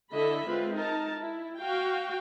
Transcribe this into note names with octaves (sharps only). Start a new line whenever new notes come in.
D3 E4 A4 D#5 E5 B5
G#3 C4 F4 B4
D#4 A#4 A5
E4
F#4 F5 G5